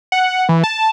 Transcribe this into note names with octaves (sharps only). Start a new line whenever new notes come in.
F#5
E3
A5